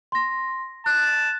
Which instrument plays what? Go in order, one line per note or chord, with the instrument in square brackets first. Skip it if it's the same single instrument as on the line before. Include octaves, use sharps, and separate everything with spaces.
[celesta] C6 A#6
[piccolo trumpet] A5 [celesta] F#6